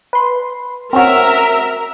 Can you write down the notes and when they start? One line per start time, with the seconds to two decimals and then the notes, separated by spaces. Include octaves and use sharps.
0.13 B4 C6
0.93 C4 C#4 F#4 A#4 E5